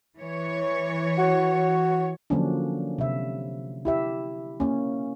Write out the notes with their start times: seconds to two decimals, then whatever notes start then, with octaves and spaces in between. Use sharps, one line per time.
0.19 E3 C#5
1.18 F#4
2.30 D3 F3 F#3 A#3 C#4 D4
2.99 C3 E5
3.85 E4 G4 E5
4.60 A#3 C#4